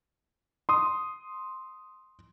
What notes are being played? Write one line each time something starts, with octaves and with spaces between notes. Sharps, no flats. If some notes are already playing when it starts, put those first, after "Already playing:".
C6 D#6